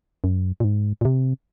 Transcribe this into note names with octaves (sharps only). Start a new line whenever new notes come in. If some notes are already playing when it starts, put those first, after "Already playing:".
F#2
A#2
G#2
A#2
C3